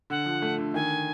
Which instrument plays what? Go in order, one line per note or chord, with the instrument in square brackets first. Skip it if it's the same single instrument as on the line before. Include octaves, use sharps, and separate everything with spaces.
[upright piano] D3 [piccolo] F#5
[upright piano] F3
A3
D3
[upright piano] D#3 [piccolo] G#5